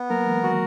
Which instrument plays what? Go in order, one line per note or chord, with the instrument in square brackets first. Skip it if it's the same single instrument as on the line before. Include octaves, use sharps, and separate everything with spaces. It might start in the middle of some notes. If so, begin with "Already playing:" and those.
Already playing: [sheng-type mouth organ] B3
[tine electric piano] F#3 A#3 [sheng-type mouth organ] A#4
[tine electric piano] E3 G#3
[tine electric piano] D#3 F#3 [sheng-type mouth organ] F#4